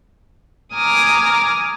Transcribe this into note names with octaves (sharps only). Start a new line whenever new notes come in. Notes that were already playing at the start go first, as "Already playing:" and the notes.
G#5 A#5 D6 D#6 F6